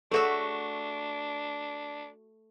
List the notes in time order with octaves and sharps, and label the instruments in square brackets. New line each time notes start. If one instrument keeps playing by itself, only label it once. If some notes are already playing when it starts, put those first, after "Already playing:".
[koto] A3 F#4 E5 [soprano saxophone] D4 [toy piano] G#4 A4 C#5